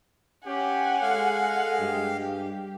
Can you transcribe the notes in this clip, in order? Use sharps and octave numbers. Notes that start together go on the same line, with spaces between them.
C#4 G4 F#5 G#5
G#3 A4 F5
G2 G4